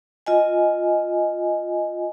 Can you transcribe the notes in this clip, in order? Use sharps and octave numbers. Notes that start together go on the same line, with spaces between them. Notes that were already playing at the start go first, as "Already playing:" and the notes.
F4 D#5 G#5